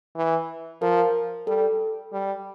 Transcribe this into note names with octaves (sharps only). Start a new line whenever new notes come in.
E3
F3 A#4
G3 A4
G3